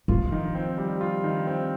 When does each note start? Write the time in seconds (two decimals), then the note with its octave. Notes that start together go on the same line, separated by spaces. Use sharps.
0.08 F3 F4
0.32 D#3
0.55 C4
0.78 G3
1.01 F4
1.24 D#3
1.47 C4